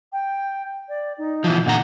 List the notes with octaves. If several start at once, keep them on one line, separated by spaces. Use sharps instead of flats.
G5
D5
D#4
B2 E3 F3
A#2 D3 F#5 A#5